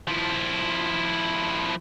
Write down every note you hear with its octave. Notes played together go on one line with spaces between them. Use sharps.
F3 E4